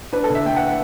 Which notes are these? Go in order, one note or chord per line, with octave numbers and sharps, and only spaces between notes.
D4 B4
A4
D3
E5
A3 G5
F#5
F#5